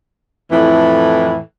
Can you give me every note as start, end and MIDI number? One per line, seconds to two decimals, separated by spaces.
0.51 1.37 41
0.51 1.37 45
0.51 1.37 52